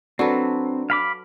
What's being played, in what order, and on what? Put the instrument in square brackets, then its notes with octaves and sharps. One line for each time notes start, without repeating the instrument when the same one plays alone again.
[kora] F#3 A4 B4 [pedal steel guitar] C4 [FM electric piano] D4
[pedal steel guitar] F5 B5 D6